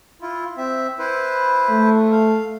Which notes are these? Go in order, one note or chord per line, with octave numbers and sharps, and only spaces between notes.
E4 F4
C4 E5
E4 B4 C5
A3
F5